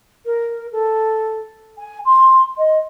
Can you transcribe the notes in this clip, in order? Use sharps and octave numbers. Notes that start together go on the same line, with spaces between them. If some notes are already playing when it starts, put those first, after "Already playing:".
A#4
A4
G#5
C6
D#5